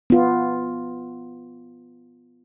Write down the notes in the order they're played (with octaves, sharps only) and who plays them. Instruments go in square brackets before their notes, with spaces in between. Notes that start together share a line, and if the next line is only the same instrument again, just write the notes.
[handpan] B3 F4